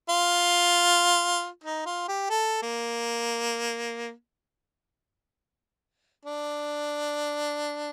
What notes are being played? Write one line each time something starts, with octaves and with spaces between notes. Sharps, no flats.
F4
D#4
F4
G4
A4
A#3
D4